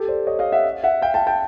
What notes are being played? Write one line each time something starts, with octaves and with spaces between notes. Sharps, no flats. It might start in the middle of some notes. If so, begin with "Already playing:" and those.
Already playing: G4 A4
C5 D5
C#5 D#5
D#5 F5
E5 F#5
E5 F#5
F5 G5
G5 A5
G5 A5